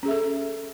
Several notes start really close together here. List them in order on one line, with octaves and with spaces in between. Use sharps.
C#4 G#4 E5 A4